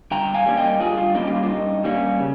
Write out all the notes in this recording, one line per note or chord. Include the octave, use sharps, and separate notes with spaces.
G2 G5 A#5
F5 G#5
G3 A#3 C#4
D#5 G5
G2 F4 G#4
F4
G3 A#3 C#4 D#4
G4
F4
F4
G2 D#4
G3 A#3 C#4
C#3